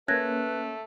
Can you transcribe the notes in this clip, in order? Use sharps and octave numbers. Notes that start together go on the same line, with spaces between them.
A3 A#3 C#4 B4 F#6 G#6 A#6